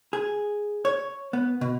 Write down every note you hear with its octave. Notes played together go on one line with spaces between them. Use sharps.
G#4
C#5
B3
B2